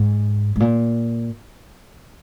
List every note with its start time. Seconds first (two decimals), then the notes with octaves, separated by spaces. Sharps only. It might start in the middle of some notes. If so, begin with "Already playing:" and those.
Already playing: G#2
0.56 G#2
0.60 A#2